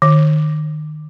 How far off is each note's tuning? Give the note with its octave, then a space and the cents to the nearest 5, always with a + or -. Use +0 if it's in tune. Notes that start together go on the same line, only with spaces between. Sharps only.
D#3 -25